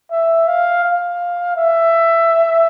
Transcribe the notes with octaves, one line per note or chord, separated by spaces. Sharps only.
E5
F5
F5
E5